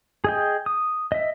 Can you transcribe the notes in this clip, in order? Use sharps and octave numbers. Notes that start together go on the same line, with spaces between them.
G#4 D#5 G5
D#6
D#5 E5